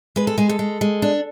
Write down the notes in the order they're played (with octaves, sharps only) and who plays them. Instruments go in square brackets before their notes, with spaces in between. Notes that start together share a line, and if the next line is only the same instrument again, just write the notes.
[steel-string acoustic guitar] G#3 B4
A4
G#3 G#4
A4
G#3
G#3
D4